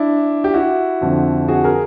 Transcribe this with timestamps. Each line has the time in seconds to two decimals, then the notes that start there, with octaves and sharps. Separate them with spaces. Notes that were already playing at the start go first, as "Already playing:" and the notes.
Already playing: D4 E4
0.44 G4
0.53 E4 F#4
1.01 F2 D3 F3
1.48 F#4 G#4
1.64 G#4 A#4